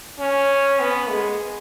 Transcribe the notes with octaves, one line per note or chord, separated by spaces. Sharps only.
C#4
B3
G#3